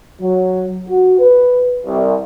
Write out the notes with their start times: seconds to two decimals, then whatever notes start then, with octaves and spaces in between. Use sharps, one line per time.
0.22 F#3
0.88 F#4
1.20 B4
1.86 C2